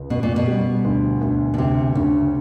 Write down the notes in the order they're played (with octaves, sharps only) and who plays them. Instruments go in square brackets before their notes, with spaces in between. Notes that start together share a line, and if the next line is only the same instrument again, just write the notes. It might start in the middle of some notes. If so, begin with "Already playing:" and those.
Already playing: [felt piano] C#2
[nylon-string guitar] B2 [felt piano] B3
[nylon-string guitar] A#2
B2
[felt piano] G3
D2
D2
[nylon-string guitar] B2
[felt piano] D2 [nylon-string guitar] C3
[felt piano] D2 [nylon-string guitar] C#3